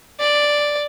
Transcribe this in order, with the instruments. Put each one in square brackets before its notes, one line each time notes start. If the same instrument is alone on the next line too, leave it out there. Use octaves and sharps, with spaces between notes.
[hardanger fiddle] D5